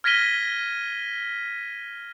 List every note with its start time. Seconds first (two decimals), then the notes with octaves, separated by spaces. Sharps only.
0.04 F6 G#6 A#6 B6 D#7 G7